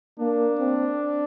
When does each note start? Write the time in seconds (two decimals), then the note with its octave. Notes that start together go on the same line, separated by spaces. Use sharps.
0.19 A#3 D4
0.59 C4